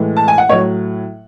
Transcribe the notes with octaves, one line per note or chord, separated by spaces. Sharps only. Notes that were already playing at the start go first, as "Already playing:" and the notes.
Already playing: A2 E3 G#3
A5
G#5
F#5
A2 F#3 C#5